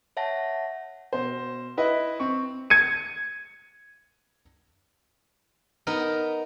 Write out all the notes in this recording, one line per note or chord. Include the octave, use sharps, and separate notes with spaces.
C#5 E5 F#5 A5 A#6
B2 C5
E4 B4 D#5 E5
C4 C#6
G#6 C#7 D#7
B3 D#4 A#4